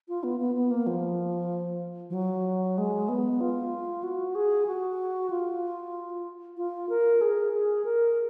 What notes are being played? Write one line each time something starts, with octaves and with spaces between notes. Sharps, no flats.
F4
B3
B3
B3
A#3
F3
F3
F#3
G#3
B3
F4
F#4
G#4
F#4
F4
F4
A#4
G#4
G#4
A#4